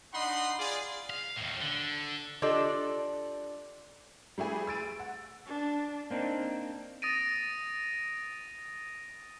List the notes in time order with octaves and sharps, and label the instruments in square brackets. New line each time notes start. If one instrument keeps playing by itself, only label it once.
[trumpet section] D4 D#4 D#5 F#5 B5 C6
F4 G#4 D5
[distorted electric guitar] F5
D#2 A2
D3
[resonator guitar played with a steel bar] D4 F4 G4 A4 D5 D#5
[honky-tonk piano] G3 A3 E4 G#4 B4
E6 A6 D7 D#7
F#5
[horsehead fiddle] D4
[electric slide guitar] A#3 C4 D4 D#4
[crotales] D#6 A6 A#6 D7 D#7